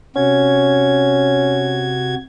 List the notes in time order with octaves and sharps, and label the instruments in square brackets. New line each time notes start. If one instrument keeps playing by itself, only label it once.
[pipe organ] C3 F#4 G#6 [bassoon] C#4